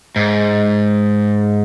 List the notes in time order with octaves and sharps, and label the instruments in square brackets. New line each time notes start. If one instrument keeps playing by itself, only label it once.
[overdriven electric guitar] G#2